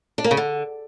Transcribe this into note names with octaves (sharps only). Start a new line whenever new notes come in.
D4
A#3
C#3
D3